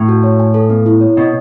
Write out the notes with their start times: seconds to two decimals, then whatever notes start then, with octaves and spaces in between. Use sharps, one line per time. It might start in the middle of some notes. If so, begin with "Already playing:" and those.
Already playing: A2
0.08 F#4
0.24 C#5
0.39 G#5
0.54 A4
0.70 B3
0.86 E4
1.01 C#5
1.17 B2 D#5